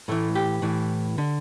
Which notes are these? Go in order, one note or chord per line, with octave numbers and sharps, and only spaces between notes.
A2 E3 A3
G4
A2 E3
D3